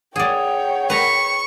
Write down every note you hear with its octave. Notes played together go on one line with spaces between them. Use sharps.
G#4 C#5 D5 F#5 G5
B4 A#5 C#6